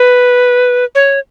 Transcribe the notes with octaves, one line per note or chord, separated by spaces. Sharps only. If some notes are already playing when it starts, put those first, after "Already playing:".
Already playing: B4
C#5